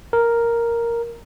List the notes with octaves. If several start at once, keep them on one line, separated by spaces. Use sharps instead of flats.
A#4